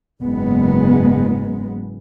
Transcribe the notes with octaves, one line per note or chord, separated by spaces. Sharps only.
F#1 G#2 G#3 B3